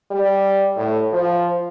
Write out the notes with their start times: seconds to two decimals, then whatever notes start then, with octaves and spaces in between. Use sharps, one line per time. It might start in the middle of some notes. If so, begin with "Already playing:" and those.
0.11 G3
0.76 A2
1.13 F3